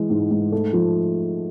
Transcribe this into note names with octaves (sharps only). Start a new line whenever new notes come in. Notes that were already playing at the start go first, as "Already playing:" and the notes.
Already playing: E3 G#3
G#2
G#2
A3
F3